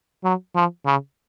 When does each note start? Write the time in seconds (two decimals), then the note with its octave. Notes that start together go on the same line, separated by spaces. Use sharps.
0.24 F#3
0.55 F3
0.86 C#3